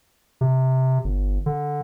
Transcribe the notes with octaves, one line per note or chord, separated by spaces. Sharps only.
C3
G1
D3